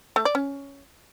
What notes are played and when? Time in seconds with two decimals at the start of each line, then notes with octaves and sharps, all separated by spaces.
0.16 A3
0.25 D5
0.35 C#4